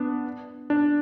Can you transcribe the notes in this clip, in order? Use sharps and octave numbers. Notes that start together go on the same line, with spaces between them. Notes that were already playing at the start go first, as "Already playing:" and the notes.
Already playing: B3 D4
D4